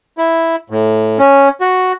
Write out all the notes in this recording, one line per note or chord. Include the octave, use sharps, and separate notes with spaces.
E4
A2
C#4
F#4